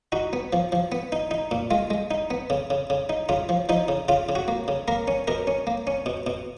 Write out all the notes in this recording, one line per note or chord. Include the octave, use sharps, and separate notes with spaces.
D#4 F#4
B3
F3
F3
B3
D#4
D#4
A#2
G#3 F4
G#3
D#4
B3
C#3
C#3
C#3
D#4
C#3 F4
F3
F3 D#4
C#3
C#3 F4
C#3
F#4
A#3
C#3
A#3 A#4
C#4
B2 A#4
C#4
A#3
C#4
B2
B2